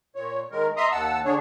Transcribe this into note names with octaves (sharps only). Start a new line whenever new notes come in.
A#2 C#5
D#3 G#3 A#4
D#5 E5 A#5 C6 D#6
D#2 F#5 A5 E6
D3 D4 G#4 C#5